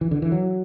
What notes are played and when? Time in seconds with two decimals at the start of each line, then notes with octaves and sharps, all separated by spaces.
0.01 E3
0.11 D3
0.22 E3
0.32 F#3